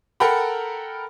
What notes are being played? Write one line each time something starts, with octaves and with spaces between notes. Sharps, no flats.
A4 A#4 F#5 G5 A#5 B5